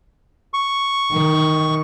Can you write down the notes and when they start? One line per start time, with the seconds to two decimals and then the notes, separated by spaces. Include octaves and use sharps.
0.54 C#6
1.13 D#3